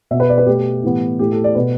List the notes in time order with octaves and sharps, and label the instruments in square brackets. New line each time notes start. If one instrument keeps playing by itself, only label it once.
[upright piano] B2 E5
B3
B4
D5
B4
B2 A3 G4
A2 E3 B3
A2 A3 G4
A4
D5
B2 B3 B4